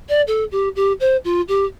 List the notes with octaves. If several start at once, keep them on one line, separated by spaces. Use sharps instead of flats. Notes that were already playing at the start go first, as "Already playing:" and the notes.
D5
A4
G4
G4
C5
F4
G4